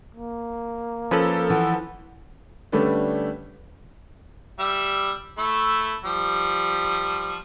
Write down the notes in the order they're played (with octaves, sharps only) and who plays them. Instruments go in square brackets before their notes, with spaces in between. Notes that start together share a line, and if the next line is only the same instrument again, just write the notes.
[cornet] A#3
[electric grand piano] F3 A4 [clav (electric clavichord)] C#4 B4
[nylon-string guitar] E3 [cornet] F#5
[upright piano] D3 G3 A3 C#4 D4 B4
[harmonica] G3 E5
A3 E4
F3 G3